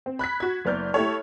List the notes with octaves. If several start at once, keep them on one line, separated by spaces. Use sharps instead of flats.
C4
B5 F#6 G#6 B6
F#4 G#6
F#1 B3 D5 F6 G6
A3 E4 G4 A4 C#5